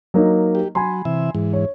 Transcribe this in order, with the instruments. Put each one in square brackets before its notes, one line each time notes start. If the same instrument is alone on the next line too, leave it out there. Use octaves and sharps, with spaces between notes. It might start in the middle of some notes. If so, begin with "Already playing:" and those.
[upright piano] F#3 A#3 D#4
[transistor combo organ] G4
[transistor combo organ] F#3 [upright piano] G#5 B5 C6
[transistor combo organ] C3 E3 E5
G#2 E3
[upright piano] C#5